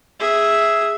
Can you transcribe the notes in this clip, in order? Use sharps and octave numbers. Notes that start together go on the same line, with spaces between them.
G#4 E5